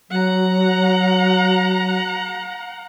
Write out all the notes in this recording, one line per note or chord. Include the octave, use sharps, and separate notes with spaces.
F#3 F#5 A#5